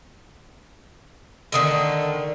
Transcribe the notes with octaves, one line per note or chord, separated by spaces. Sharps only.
D3 D#3 A3